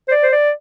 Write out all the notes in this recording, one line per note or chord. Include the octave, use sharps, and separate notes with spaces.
C5
D5
C5
D5